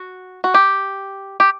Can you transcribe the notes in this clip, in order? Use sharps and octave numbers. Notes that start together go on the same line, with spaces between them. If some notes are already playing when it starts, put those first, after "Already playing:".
Already playing: F#4
F#4
G4
G4